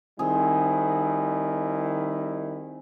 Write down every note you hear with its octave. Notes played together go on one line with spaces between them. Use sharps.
D#3 G3 C4 E4 G#4